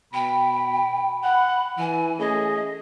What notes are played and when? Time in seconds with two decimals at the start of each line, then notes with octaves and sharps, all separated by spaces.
0.14 B2 G5 B5
1.24 F#5 B5
1.78 E3 G#5
2.19 A3 C#4 G#4 D#5